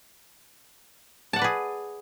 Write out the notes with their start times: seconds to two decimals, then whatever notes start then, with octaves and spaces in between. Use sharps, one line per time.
1.33 A5
1.36 F#5
1.39 D5
1.42 B4
1.44 G#4